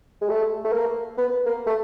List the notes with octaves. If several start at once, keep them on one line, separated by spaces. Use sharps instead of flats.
G#3
A3
A3
A#3
B3
A#3
A3